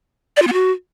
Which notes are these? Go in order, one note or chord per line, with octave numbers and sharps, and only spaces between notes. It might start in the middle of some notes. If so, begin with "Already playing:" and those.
D5
F4
B3
F#4